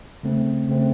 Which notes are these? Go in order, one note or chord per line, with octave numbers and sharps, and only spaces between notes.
C#3 A3 C4
C#3 A3 C4